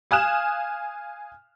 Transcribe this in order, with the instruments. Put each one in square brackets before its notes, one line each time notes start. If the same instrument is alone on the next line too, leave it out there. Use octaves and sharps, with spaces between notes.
[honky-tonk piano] F5 G#5 D#6 F6 F#6 E7